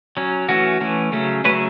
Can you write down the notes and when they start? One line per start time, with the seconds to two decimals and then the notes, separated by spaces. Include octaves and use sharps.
0.17 F#3 C#4
0.49 E3 A3 C#4 F#4
0.81 E3 A3 C#4
1.12 C#3 F#3 A3 C#4
1.44 C#3 F#3 A3 C#4 B4